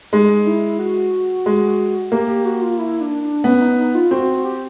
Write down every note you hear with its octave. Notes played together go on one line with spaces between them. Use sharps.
G#3 D#4
E4
F#4
G#3
A#3 G4
G4
F#4
F4
E4
D4
D4
B3 C#4
D#4
D#4
F4
C4 F#4
G4